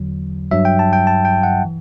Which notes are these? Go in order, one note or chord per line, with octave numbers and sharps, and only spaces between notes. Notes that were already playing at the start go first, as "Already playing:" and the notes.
Already playing: E2 D3 F#3
G2 F#3 E5
G5
A5
G5
A5
G5
F#5
E3